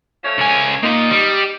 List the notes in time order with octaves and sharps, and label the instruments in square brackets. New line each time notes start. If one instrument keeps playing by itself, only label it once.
[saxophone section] F3 A3 C#5
[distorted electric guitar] C#2 G#5
[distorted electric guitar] A#3 F4 [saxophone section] D#4
[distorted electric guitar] G3